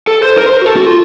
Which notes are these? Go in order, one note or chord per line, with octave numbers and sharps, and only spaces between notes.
A4
C5
A#4
C5
A#4
F#4
A4
F#4
F4